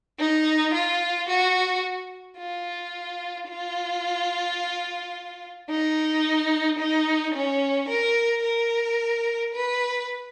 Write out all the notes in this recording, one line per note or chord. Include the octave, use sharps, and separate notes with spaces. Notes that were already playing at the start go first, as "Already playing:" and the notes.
D#4
F4
F#4
F4
F4
D#4
D#4
C#4
A#4
A#4
B4